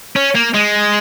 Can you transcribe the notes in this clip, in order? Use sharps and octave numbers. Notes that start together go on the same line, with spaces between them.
C#4
A#3
G#3